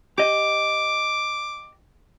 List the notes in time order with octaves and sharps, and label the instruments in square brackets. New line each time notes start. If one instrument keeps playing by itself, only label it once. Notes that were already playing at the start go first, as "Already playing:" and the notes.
[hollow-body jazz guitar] G4 D#5 [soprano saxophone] D6